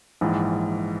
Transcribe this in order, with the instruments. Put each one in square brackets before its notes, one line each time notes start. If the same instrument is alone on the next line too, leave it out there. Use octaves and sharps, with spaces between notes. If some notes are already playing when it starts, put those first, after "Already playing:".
[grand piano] A#1 G#2 E3